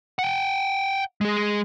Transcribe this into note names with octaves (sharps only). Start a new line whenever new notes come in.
F#5 G5
G#3 G#4